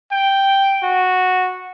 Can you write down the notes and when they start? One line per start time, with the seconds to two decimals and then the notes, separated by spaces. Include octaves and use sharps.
0.11 G5
0.83 F#4